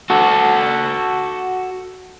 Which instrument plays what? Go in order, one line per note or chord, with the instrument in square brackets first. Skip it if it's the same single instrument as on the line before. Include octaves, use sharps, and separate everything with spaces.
[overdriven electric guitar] F#4 A4